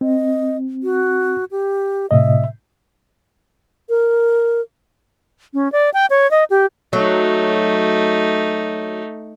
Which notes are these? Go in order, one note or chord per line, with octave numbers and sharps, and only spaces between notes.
C4 D#5
F#4
G4
A2 C3 D#5 E5
A#4
C#4
D5
G5
C#5
D#5
G4
F#3 A3 D#4